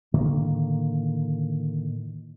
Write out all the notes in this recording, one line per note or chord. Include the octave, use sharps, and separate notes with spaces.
A2 D3 D#3 A#3